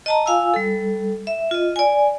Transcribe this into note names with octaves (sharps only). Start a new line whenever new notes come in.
D#5 A5 A#5
F4 F5 G#5 E6
G3 A4
E5
F4 D#5
D5 G#5